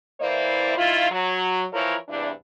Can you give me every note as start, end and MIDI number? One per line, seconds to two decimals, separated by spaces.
0.21 0.73 52
0.21 0.73 58
0.21 0.73 64
0.21 0.73 72
0.21 0.73 74
0.77 1.10 51
0.77 1.10 64
0.77 1.10 65
1.11 1.64 54
1.73 1.95 52
1.73 1.95 53
1.73 1.95 64
1.73 1.95 70
1.73 1.95 73
2.09 2.30 40
2.09 2.30 43
2.09 2.30 48
2.09 2.30 62
2.09 2.30 64